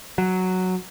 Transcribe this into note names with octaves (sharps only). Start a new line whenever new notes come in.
F#3